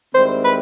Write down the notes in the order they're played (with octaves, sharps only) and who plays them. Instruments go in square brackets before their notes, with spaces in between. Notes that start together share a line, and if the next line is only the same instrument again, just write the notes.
[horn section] G#2 D#3 G3 C4 E4 [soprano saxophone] C5
[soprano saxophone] B4